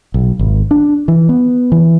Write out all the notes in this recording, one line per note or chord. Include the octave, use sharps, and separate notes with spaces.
B1
G#1
D4
E3
B3
E3